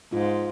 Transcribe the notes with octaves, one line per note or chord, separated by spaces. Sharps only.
G#2 F4